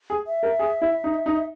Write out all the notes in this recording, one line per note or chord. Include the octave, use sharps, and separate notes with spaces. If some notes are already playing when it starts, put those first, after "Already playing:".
G#4
E5
A#4
G#4
E4
D#4
D#4